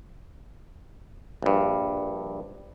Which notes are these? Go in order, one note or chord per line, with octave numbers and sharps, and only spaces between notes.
A#1 G2